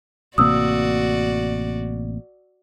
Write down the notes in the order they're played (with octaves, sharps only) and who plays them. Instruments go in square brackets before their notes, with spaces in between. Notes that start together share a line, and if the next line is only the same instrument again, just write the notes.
[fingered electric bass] A1 C3 A#3 [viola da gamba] F#4 D5 [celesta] D#6 E6